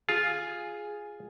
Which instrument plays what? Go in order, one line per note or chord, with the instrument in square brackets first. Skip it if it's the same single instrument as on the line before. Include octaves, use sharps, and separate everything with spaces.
[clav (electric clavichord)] F4 [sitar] G#4